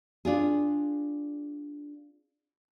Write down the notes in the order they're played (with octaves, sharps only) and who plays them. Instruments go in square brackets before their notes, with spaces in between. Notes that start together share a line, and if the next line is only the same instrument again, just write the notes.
[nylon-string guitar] D4 F4 G#4